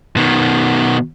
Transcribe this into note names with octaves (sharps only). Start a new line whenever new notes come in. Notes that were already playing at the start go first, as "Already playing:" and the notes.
B2 D#3